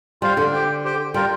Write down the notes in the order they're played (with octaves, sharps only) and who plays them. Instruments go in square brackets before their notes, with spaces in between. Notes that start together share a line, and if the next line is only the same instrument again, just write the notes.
[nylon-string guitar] G3 [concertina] F4 C5 F5
[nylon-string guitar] D3
[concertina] G4 C5 G5
G4 C5 G5
[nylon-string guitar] G3 [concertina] F4 A#4 G5